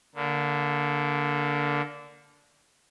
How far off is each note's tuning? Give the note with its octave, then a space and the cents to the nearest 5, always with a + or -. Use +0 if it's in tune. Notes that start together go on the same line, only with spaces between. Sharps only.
D3 -15 A#3 +0